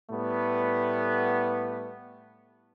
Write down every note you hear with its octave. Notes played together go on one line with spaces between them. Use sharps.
A2 G3 A3 B3